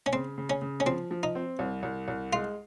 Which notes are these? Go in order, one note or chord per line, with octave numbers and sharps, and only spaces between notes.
C#4
C#3 C4
C#3
C#4
C#3
C#4
F3 C4
F3
D#4
C4
C2
C2
C2
G#3 F4